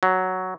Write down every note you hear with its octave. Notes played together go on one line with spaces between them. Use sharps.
F#3